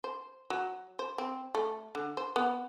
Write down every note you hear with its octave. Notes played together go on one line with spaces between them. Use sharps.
C5
F#3
C5
C4
A3
D3
C5
B3